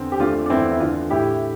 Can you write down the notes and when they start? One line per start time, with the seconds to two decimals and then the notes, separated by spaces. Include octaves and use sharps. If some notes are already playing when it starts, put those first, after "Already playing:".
Already playing: E2 D3 C4
0.12 G4
0.20 A3 D4 F4
0.46 D4
0.50 E2 C4 E4
0.72 E4
0.80 D3 D4 F4
1.10 A2 E4 G4